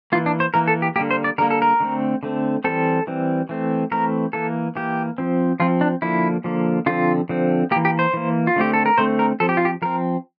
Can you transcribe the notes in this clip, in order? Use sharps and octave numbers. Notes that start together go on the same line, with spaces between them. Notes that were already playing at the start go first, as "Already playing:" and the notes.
E3 A#3 F4
D4
C5
E3 A#3 A#4
A4
G4
D3 G3 A#3 G4
C5
D5
D3 G3 A#3 A#4
A4
A#4
D3 A3 C4
D3 A3 C4
E3 G3 C4 A4
E3 G3 C4
E3 A3 C4
E3 A3 C4 A#4
E3 A#3 A4
E3 A#3 G4
F3 C4
F3 C4 F4
D4
D3 F3 A#3 E4
D3 F3 A#3
D3 F3 C4 F4
D3 F3 C4
E3 A#3 G4
G4
C5
E3 A#3
F4
D3 A3 C4 G4
A4
A#4
D3 A3 C4 C5
A#4
F3 C4 A4
G4
F4
G4
F3 C4 A#4